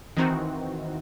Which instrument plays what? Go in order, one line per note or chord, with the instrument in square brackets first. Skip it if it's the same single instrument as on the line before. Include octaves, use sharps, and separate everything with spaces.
[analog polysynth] D#3 E3 C4 D#4 F#4